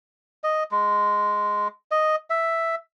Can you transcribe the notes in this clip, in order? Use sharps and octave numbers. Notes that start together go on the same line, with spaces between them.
D#5
G#3
D#5
E5